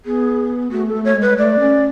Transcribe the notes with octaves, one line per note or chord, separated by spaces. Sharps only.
B3 G#4
A3 F#4
A4
A3
C#5
G#3
B4
G#3
A3 D5
C#4